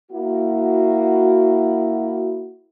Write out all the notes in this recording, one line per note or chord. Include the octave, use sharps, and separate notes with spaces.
A#3 E4 F#4